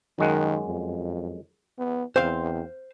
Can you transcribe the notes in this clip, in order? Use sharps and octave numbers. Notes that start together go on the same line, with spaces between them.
F#2 D#3 G#3 F#5
F2
B3
E2 C4 C5 F5